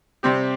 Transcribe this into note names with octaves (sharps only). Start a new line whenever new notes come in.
C3 G3 C4 G4